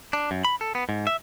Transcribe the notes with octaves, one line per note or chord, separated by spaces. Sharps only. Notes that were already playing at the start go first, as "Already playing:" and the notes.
D4
F#2
B5
A4
B3
G#2
E5